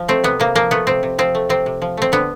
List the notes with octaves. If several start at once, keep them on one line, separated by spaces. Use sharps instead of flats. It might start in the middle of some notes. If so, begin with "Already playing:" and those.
Already playing: F3
A3 C4
C3 B3
C3 A#3
F3 A#3
A3 B3
C3 C4
C3
F3 C4
A3
C3 C4
C3
F3
A3 C4
D3 B3